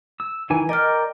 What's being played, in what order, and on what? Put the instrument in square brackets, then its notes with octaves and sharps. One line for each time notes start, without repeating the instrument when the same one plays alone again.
[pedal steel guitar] E6
D#3 E3 G#5
[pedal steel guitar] A#4 D5 G5 [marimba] D#5 F6